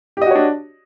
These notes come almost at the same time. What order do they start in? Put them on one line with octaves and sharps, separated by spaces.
G4 D#5 F#4 C#5 D4